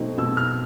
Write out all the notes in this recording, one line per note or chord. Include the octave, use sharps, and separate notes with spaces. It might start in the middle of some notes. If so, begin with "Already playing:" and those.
Already playing: B2 F#3 A3 C4 D#4
B2 E6
F6